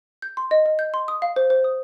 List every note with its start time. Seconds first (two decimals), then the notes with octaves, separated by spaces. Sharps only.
0.22 G6
0.37 C6
0.51 D#5
0.66 D#5
0.79 G6
0.94 C6
1.08 D#6
1.22 F5
1.36 C5
1.50 C5
1.64 D#6